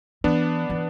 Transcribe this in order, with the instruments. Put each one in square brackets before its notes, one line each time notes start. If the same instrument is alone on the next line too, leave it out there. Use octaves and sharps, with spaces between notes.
[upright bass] E3 [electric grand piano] B3 D4
[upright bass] E3